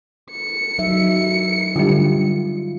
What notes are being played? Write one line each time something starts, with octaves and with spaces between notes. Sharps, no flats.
C#7
F#3 D#4 E5
D3 G3 F4